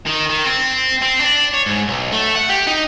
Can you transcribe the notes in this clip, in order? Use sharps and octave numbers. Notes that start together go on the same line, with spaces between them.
D#3
D#3
C4
C4
D4
C#5
G#2
B1
A3
F#5
G4
D#4